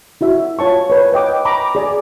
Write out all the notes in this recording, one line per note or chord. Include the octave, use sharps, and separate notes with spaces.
E4 F#4 E5
F4 C#5 A5 C#6
B4 C#5
B4 D#5 G5 D6
A#5 B5 C#6 D6
G#4 D5 G#5